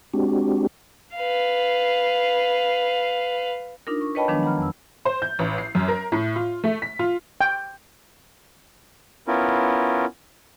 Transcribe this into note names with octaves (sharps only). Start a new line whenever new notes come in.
G#3 C4 D4 F#4 G4
B4 F5
D4 D#4 F4 A#4
C#6
B4 C#5 D#5 G5 A5 B5
D#3 F3 F#3 G#3 B3 D4
F#5 A#5 B5 F6
F2 E6
C5
G6
A1
C7
F#2
A#4
A2
F4
A3
B6
F4
G5
B3 C#4 E4 F4 A#4